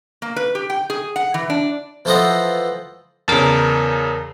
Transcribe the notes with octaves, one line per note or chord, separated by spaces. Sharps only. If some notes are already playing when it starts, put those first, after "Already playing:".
A#3
B4
G4
G5
G#4
F#5
E3
D4
E3 F3 A4 C5 D#5 F#5
E2 C#3 A#4 A5